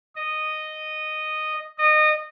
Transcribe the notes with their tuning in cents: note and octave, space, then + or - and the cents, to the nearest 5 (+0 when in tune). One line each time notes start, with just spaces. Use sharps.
D#5 -10
D#5 -25